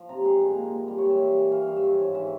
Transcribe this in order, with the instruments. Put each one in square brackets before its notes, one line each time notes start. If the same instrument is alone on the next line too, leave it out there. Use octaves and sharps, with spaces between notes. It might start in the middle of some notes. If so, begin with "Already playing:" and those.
Already playing: [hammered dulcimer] F3
C3 A#5
G#3 C6
A#2
A#3
E3
G3 C6
C#5
A#2
E5
G3
E3
E3 F5
G5
G2 F5
E5
F3 C#5
G#2
E3 E5